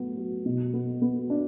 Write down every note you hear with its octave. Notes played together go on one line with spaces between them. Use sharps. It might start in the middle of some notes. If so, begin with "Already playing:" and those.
Already playing: A2 F#3 B3
F#3
B2
B3
B3
D4